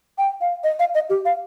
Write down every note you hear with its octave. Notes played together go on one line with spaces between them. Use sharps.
G5
F5
D#5
F5
D#5
G4
F5